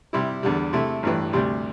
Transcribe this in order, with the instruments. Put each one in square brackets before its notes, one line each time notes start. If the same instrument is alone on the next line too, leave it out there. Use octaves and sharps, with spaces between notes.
[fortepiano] C3 G3 E4
E2 D3 G3
C3 A3 E4
A1 G2 E3
D2 C3 G3